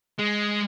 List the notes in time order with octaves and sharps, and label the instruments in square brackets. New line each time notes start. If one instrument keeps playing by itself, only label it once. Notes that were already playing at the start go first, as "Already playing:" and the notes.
[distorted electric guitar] G#3